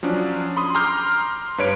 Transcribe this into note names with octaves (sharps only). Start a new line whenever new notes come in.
F3 F#3 C#4 D4
B5 C6 D#6
A#5 C6 D6 F6 G6 C7
G2 B4 C#5 D7